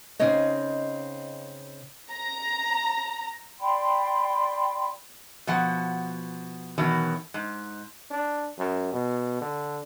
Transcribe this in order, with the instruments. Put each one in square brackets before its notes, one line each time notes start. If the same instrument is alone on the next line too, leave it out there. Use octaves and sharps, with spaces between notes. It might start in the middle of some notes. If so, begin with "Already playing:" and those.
[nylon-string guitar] C#3 C4 D#4 C#5 D#5
[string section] A#5
[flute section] D5 G5 B5 C6
[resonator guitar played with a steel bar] B2 F3 F#5
B2 D#3 E3 F#3
G#2
[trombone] D4
F#2
B2
D3